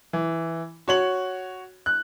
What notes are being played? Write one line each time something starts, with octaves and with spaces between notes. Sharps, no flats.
E3
F#4 C#5 F#7
F#6